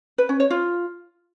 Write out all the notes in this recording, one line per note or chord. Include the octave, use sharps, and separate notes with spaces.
B4
C#4
C#5
F4